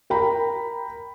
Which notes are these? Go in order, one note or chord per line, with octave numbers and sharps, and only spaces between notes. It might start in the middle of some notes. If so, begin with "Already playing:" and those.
A#4 G5 A#5 B5